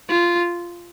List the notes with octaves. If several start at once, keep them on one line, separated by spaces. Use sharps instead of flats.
F4